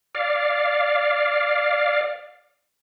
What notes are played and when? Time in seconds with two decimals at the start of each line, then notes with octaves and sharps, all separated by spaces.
0.15 D5 F5